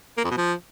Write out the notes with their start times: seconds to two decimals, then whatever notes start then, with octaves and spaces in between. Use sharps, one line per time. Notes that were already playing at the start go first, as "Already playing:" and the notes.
0.18 A#3
0.24 F2
0.31 B2
0.37 F3